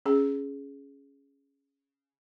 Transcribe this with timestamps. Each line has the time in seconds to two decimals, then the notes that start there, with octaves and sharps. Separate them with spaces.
0.06 C#4 G#4